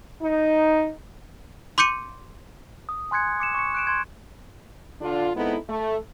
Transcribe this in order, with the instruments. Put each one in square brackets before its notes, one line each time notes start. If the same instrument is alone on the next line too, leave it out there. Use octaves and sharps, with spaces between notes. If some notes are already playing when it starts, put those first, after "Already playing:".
[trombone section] D#4
[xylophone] C6 D6 G6 C#7 D#7
[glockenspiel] D#6
G#5 C6 F#6 G#6 C#7
D6 C#7 E7
C#6 C#7
F#6 D7 E7
C6 G6 G#6
[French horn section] D3 D4 F4
G#3 B3 C4 D#4 E4 A4
A3